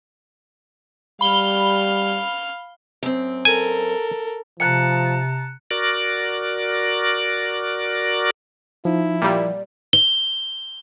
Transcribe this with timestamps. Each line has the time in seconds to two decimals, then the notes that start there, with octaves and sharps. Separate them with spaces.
1.21 G3 F5 B5 F6 G7
3.03 F#2 C4
3.45 A4 A#4 G#5
4.60 C3 F3 A5 A#5 F#6 C#7
5.71 F#4 A#4 D5 D6
8.85 F3 D#4 E4
9.22 A#2 G3 D5
9.93 G7